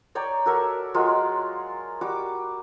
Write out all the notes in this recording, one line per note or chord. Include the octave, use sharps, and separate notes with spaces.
C#5 D5 G5 A#5
F#4 A4 A#4 E5
F#3 G#3 F4 A#4
G3 F#4 D6